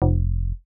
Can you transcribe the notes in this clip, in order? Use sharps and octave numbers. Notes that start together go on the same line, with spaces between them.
F1